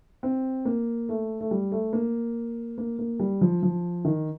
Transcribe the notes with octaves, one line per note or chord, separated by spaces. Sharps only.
C4
A#3
A3
A3
G3
A3
A#3
A#3
A#3
G3
F3
F3
D#3